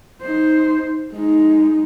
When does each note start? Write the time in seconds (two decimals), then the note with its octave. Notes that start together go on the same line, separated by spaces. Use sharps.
0.22 D#4 C5
1.14 G#3 D#4